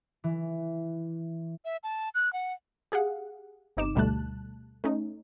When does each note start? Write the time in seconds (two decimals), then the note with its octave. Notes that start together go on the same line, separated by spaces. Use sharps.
0.24 E3
1.65 E5
1.83 A5
2.15 F#6
2.33 F#5
2.92 G4 G#4 F5 F#5
3.77 G1 C3 D#4 D6 E7
3.95 D2 B2 G3 A3 A5 F#6
4.84 A3 C#4 D#4